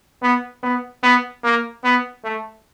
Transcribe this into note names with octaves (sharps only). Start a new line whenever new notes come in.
B3
B3
B3
A#3
B3
A3